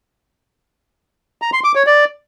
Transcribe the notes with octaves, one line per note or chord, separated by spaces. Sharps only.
A#5
C6
D6
C#5
D5